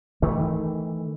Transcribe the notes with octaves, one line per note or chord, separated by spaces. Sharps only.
D#3 E3 A3